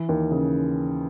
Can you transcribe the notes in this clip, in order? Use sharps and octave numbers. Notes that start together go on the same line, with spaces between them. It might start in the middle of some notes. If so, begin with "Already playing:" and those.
Already playing: E3
D#2
C#3